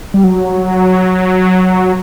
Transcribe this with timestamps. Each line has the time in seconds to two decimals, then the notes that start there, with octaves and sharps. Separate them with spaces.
0.14 G3
0.24 F#3